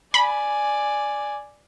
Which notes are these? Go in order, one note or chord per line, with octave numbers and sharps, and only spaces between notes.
D5 G#5 B5